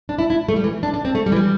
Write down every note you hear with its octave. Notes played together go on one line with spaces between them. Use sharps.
D4
E4
E4
A3
G3
E3
D4
D4
C4
A3
G3
E3
G3